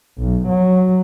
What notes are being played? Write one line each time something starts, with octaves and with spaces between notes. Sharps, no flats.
B1
F#3